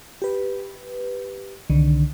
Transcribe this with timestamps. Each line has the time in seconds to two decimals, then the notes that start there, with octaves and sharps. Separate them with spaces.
0.22 G4 B4
1.70 C2 D3 D#3